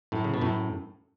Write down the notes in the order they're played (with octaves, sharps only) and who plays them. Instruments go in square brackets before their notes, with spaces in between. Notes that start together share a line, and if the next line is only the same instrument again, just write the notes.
[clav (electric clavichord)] F#2 A2
C#3
B2
F#2 A2